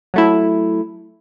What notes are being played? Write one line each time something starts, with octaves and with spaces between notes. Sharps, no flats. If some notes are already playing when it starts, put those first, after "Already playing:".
F#3 A3 E4